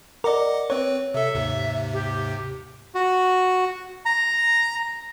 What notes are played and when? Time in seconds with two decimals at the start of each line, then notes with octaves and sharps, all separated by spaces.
0.24 A#4 D5 D#5 F#5 D6
0.70 C4 B4 C#5
1.14 C3 A4 E5
1.35 D#2 G#2 C3
1.93 G4
2.95 F#4
4.06 A#5